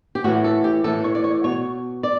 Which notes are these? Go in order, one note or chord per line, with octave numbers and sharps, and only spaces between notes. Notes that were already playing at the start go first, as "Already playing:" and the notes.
G4
A2 E3 F#4
A4
G4
A2 E3 A4
C#5
D5
C#5
B2 C#5
D5